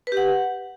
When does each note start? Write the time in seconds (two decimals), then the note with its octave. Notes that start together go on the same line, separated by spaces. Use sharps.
0.07 B4
0.12 G4
0.17 F#5